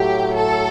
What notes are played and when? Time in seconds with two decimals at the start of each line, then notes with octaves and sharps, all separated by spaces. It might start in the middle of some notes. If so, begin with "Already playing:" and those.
Already playing: A2 F#3 A3 G4
0.37 A4